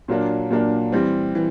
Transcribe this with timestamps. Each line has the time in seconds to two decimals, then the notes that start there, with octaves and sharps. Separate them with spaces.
0.08 A#2 F#3 A#3 D4
0.50 A#2 F#3 A#3 D4
0.92 E3 G3 C4
1.35 E3